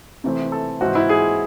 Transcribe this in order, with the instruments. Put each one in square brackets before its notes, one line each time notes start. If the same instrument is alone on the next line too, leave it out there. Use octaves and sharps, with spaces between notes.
[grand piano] C3 E3 A3 C4
A4
G#2 E3 C4 F#4
E4
G#4